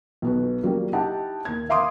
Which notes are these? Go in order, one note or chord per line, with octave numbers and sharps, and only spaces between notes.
B1 B3 F#4
C#3 F#3 G3 A#3
D#4 E4 G4 F#5 A5
D#2 G#6
E5 F5 C6 D6 D#6